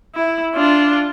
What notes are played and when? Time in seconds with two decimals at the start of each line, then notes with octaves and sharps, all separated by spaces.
0.14 E4
0.55 D4 F4